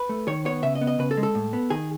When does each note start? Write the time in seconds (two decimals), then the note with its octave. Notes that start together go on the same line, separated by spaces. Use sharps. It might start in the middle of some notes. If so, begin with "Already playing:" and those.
Already playing: B4
0.09 A3
0.27 D#3 C#5
0.45 B3 C#5
0.63 C#3 E5
0.75 D#5
0.81 B3
0.87 D#5
0.99 C#3 B4
1.11 A4
1.17 G#3
1.23 A4
1.35 A2
1.53 B3
1.70 D#3 G#4